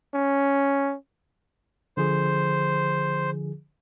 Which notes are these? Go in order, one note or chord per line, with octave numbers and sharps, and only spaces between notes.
C#4
D3 F3 G#4 C5